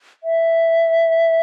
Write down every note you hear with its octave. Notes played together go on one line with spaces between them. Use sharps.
E5